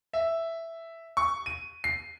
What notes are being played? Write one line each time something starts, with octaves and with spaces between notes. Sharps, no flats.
E5
C#6
D#7
C7